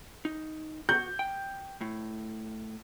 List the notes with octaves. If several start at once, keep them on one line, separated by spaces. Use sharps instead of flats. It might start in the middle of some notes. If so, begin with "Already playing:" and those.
D#4
F#4 G6
G5
A2